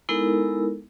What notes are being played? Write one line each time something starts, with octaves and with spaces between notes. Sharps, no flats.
G#3 B3 D#4 E4 A4 A#4